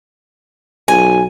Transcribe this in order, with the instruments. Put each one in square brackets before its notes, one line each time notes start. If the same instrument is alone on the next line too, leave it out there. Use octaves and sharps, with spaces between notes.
[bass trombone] B1 [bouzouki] G#5